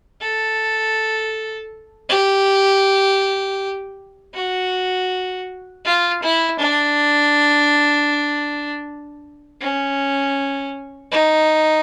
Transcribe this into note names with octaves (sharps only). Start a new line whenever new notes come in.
A4
G4
F#4
F4
E4
D4
C#4
D#4